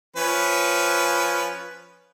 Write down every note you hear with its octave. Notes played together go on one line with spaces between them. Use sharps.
F3 C#4 B4